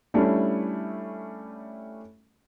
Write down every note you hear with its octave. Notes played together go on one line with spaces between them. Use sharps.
G3 A3 C#4 D4 E4